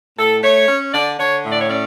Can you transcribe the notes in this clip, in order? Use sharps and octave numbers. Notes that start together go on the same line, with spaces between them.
A2 A4
A3 C#5
C#4
D3 D5
D3 C#5
A2
D5
C#5
C#4 D5